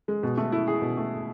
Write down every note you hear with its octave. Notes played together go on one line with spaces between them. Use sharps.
G#3
B2
A3
E4
G#4
B2
A3